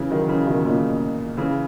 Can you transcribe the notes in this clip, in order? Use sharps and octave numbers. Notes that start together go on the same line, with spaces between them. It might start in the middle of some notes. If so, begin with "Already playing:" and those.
Already playing: C#3 E3
D#3 F#3
C#3 E3
B2 D#3
A#2 C#3
C#3 E3